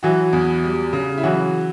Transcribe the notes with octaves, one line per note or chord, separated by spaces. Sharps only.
E3 F#3 F#4
E2
G3
C#3
E4
E3 F#3 F#4